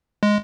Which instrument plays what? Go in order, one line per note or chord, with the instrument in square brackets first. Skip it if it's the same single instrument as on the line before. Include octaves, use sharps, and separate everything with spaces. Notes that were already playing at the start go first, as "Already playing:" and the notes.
[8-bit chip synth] G#3